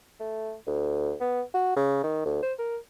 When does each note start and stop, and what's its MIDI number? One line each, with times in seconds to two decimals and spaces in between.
0.20 0.55 57
0.67 1.14 38
1.21 1.42 59
1.54 1.73 66
1.76 2.02 49
2.03 2.25 51
2.25 2.41 38
2.43 2.53 72
2.59 2.77 70